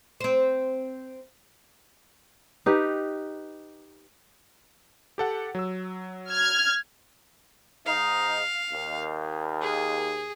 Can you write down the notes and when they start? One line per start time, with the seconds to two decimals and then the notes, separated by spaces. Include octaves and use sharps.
0.20 C4 C5
2.66 D#4 G4 B4
5.18 G4 A4 F#5
5.55 F#3 E6
6.30 F6 G#6
7.86 G#2 D#4 F5
8.72 D#2
9.62 G#4